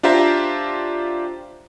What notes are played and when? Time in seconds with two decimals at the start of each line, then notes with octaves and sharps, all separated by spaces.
0.03 D4 F4 G4 C5 E5 A#5